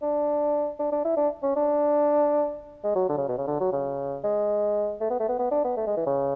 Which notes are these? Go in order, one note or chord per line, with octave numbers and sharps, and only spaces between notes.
D4
D4
D4
E4
D4
C#4
D4
G#3
F#3
D3
C#3
B2
C#3
D3
F#3
C#3
G#3
A3
B3
A3
B3
B3
D4
B3
A3
G#3
E3
C#3